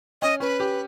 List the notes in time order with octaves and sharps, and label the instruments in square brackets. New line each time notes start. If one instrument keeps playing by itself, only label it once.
[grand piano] C#4 [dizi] D#5
[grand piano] C#4 [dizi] B4
[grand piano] G4